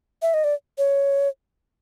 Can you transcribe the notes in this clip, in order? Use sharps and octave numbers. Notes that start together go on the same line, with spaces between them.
E5
D#5
D5
C#5